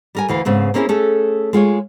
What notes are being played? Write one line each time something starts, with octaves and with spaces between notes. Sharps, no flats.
G3 A#4 G#5
D2 E3 F5
G#2 C#3 B3 C4
A#3 C4 C#4 E4 G4 G#4
A3 C#4 G#4 A4
G#3 F4 G#4 C#5